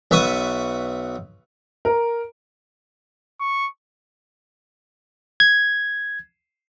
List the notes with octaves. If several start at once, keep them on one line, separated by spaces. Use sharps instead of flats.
B1 B4 E5 C#6 D#6
A#4
C#6
G#6